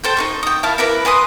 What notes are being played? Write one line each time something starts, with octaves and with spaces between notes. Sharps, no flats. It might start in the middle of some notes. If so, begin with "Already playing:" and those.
A4 C5 G5
D#4 G#4 C#6
G5 D#6
E4 A#4 F5 A5
E4 A#4 B4 D6
B4 G#5 C6 D#6